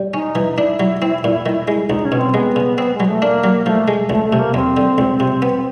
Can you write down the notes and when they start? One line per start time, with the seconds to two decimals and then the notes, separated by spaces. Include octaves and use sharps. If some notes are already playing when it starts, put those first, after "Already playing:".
Already playing: G3
0.14 C#4 D#4
0.35 E3
0.53 D#4
0.58 D4 E4
0.80 F#3
1.02 C4
1.24 A#2
1.46 D#3
1.68 G#3
1.85 E4
1.90 C#2 D#4
2.05 C#4
2.12 B2
2.19 C4
2.34 G#3 B3
2.56 C#3
2.78 C4
2.94 G#3
3.00 F#3
3.08 A3
3.22 A#3 D4
3.44 F#3
3.66 F3 A3
3.88 G#3
4.10 C#2 A3
4.25 A3
4.33 C3
4.39 A#3
4.54 D#2 C4
4.77 D3
4.98 C#2
5.20 C3
5.42 B3